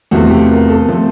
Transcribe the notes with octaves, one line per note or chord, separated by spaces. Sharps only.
E2 C3 F3 A3 F#4
G4
A#4
A4
C3 F3 A3